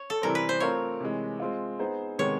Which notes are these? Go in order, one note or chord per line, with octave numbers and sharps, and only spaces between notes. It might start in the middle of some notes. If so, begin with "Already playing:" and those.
Already playing: C#5
A4
C3 E3 G3 C4 A#4
B4
C5
A3 C4 F4 A#4 C#5
C3 E3 G#3
G#3 C4 F4
B3 D#4 G#4 C5
C3 D#3 G#3 B3 C#5